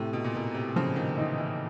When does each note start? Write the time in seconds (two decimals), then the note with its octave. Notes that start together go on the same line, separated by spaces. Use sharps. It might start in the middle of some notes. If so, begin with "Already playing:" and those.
Already playing: A2 C3
0.13 B2
0.24 A#2
0.34 B2 A#3
0.54 C3
0.76 C#3 F3
0.96 D#3
1.17 E3 D#4
1.38 E3